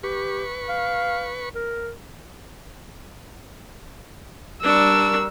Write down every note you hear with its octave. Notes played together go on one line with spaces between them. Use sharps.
G4 B4 C#6
F5
A#4
G3 D4 A#4 C#6 E6